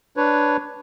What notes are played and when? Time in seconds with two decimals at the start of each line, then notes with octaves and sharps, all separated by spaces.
0.17 D4 B4 C#5